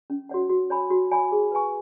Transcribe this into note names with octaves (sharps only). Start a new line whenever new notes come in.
C#4
F#4 C#5 F#5
F#4
C#5 G#5 B5
F#4
C#5 G#5 B5
G#4
B4 G#5 C#6